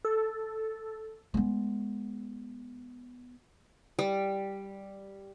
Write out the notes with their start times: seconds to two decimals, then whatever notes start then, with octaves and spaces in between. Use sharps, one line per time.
0.05 A4
1.34 G#3 B3
3.99 G3